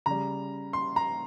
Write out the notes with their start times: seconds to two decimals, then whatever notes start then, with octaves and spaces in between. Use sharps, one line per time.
0.06 C#3 G3 A#5
0.73 C6
0.96 A#5